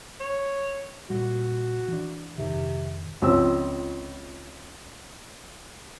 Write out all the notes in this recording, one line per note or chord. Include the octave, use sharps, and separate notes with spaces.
C#5
A#2 G3 F#4
E3 D4
F2 G#2 C3 D#3
C#2 F3 C4 E6